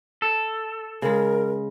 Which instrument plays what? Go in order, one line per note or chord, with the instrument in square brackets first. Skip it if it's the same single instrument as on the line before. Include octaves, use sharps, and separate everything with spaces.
[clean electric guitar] A4
[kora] C#3 G#3 [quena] A#4